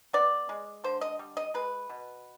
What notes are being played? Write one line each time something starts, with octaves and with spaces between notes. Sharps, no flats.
B3 D5
G#3
D3 C5
D#5
G3
D#5
G#3 B4
B2